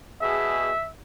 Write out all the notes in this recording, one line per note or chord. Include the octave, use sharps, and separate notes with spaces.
B2 G#4 E5